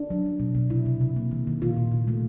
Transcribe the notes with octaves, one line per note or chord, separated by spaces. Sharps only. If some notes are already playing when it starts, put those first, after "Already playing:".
Already playing: D4
F#3
F#3
B2
B2
C3 E4
C3
C3
A#3
D#3
D#3
A#2 F4
A#2
A#2
A3